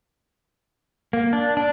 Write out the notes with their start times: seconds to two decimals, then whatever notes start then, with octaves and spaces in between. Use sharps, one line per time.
1.13 A#3
1.33 D4
1.57 D4